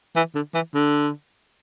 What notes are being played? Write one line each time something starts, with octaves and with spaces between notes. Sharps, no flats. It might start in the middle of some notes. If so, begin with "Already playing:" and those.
E3
D3
E3
D3